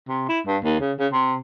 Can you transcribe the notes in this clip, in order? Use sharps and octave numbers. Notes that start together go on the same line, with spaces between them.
C3
E4
G2
D#2
C#3
C#3
C3